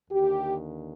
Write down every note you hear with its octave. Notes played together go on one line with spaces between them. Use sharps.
D#2 D3 G4